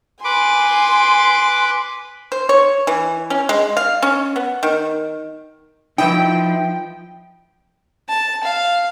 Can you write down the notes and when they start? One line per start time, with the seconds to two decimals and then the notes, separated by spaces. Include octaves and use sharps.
0.24 B4 G#5 C6 D6
2.32 C5
2.49 C#5
2.87 E3
3.30 C#4
3.49 G#3
3.77 F5
4.02 C#4
4.36 B3
4.63 D#3
5.98 F3 D#4 E4 B4 G5
8.09 A5
8.43 F5